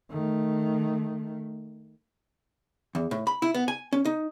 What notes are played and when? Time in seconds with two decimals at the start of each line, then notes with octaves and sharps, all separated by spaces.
0.10 D#3 A3
2.95 E2
3.11 A2
3.27 B5
3.42 E4
3.54 B3
3.68 G#5
3.93 C#4
4.05 D#4